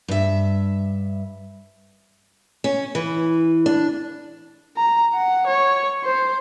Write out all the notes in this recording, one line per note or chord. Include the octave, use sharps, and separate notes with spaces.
G2 E5
C#4
E3
D4
A#5
F#5
C#5
C5